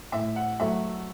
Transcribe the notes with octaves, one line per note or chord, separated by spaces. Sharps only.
A2 E5
F#5
F#3 A3 E5